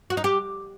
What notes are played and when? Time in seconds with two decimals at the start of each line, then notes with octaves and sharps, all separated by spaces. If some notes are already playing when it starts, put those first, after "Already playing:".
0.10 F#4
0.17 D#4
0.24 G4